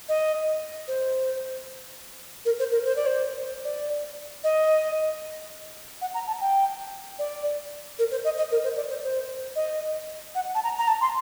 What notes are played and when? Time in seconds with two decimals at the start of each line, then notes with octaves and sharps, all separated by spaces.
0.09 D#5
0.88 C5
2.45 A#4
2.59 C5
2.72 A#4
2.85 C5
2.96 D5
3.06 C5
3.65 D5
4.44 D#5
6.01 F#5
6.14 A#5
6.27 A5
6.41 G5
7.19 D5
7.99 A#4
8.11 C5
8.25 D#5
8.38 D#5
8.51 A#4
8.64 C5
8.76 D5
8.90 C5
9.04 C5
9.56 D#5
10.35 F#5
10.55 A5
10.64 A#5
10.78 A#5
10.88 A5
11.01 C6